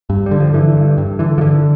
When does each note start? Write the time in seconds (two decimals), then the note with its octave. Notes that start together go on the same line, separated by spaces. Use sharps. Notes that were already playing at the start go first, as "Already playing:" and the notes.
0.10 G2
0.26 G3
0.31 D3
0.40 F3
0.54 D3 E3
0.76 G2
0.98 G2
1.19 D3 E3
1.38 F3
1.41 D3 E3